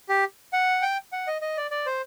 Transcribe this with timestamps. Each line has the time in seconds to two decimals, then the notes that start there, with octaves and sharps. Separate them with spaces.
0.09 G4
0.53 F#5
0.82 G5
1.12 F#5
1.27 D#5
1.42 D#5
1.57 D5
1.71 D5
1.86 C5